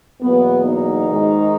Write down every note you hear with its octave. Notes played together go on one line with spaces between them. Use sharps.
E2 B2 F#3 A#3 B3
D#4
G#2 D#3 G#3